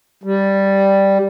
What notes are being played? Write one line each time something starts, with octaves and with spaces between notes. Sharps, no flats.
G3